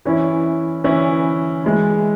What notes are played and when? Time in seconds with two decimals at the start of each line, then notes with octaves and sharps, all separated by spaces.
0.05 E3 C#4 E4
0.84 E3 C#4 E4
1.64 E3 G#3 E4